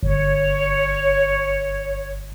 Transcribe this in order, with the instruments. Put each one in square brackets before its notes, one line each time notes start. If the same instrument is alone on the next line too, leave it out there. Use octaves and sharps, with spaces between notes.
[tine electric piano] G1 [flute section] C#5